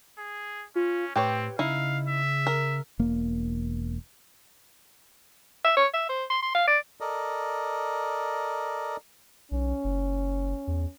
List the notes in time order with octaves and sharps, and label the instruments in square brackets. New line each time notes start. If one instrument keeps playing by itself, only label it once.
[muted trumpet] G#4
[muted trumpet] C#4 [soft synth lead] F4
[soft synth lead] A2 [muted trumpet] C4 [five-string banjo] G4 B4 C#5
[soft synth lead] C#3 [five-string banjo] D#4 E4 [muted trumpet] F5
[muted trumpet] E5
[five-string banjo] A#4
[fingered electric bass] E1 A#3
[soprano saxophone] E5
C#5
E5
C5
C6
C6
F5
D5
[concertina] A4 A#4 D5 D#5
[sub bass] B1 [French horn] C#4
[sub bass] F#1
E2